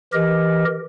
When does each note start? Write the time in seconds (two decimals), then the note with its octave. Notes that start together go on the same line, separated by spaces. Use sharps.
0.13 E3 G4 A#4 D#5